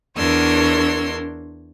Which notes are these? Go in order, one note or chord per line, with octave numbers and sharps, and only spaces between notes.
E2 D4 A#4 C#5 C6 E6